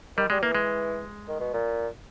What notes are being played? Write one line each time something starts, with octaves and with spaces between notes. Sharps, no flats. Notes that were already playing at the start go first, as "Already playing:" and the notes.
D#3 G3
G3 G#3
E3 A#3
G#3
D#3
B2
A#2